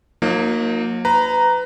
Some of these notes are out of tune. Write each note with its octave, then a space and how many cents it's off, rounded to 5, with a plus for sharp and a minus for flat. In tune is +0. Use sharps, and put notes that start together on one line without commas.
F#3 -40 A#3 +0 D#4 +0
B4 +25 A#5 +0